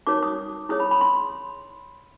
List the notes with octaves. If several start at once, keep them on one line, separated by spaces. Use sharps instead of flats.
D#4 F#4 A#4 C#5 D6
D#6
E4 G#4 C#5 D#6
B5
B5
C6